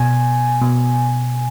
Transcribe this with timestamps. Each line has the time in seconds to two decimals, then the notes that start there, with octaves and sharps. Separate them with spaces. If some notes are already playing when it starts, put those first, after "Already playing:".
Already playing: B2 G#5
0.62 B2